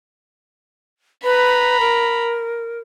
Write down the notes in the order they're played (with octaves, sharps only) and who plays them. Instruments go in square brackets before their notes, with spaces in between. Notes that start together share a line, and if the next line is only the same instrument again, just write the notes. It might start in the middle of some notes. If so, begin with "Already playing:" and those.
[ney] B4 [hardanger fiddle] A#5 B5
[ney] A#4